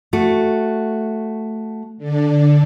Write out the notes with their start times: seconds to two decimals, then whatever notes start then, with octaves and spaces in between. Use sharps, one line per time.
0.13 A3 F#4
1.98 D3 D4